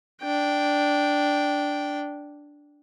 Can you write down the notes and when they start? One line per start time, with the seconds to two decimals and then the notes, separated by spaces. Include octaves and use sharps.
0.22 D4 G5